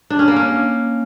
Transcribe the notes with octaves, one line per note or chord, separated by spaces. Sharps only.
D4
C#4
A#3
C#4